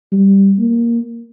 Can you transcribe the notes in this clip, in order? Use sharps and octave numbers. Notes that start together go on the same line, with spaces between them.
G3
A#3